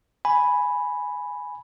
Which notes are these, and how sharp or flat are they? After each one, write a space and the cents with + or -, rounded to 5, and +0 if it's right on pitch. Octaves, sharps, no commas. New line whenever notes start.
G#5 +0 B5 +0